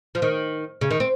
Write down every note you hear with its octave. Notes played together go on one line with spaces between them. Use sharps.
F3
D#3
C#3
D#3
C4